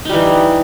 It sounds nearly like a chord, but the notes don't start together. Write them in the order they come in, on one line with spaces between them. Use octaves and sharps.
D#4 G3 E3